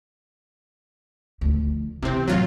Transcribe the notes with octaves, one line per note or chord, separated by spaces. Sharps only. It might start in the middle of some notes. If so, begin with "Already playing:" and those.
D2 F3
C3 E3 C4
A1 F#3 F4